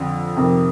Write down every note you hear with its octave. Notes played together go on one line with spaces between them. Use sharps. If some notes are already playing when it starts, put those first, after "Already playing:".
Already playing: F2 D3 F3
F2 C3 D#3